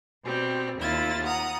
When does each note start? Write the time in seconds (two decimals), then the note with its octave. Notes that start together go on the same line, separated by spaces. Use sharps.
0.24 B2 G3 C4
0.79 D#2 E4 F4 A6
1.25 F#5 A#5 D#6